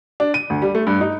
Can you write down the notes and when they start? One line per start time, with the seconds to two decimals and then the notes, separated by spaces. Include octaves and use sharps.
0.20 D4
0.34 D#7
0.50 D2
0.62 G3
0.75 A3
0.87 G2
1.01 D#4